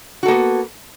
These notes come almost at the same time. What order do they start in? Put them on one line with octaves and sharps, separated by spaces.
F#4 A4 A#3 B3